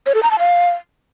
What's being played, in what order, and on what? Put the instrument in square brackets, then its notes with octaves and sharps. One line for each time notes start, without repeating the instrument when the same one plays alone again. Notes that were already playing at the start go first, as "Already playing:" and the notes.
[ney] C#5
A4
A#5
A5
F5